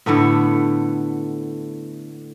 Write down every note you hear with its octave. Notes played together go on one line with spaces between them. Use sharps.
A2 D3 A3 B3